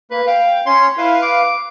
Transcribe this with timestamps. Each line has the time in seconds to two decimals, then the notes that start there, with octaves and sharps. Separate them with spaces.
0.11 A#3 B4
0.27 F5 G5
0.66 C#4 C#5 C6
0.98 E4 B4 F5
1.22 D6